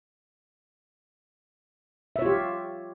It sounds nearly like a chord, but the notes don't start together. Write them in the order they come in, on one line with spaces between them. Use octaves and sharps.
E5 C#5 F4 G4